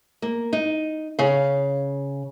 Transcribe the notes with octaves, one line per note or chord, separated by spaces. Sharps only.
A#3
D#4
C#3 F5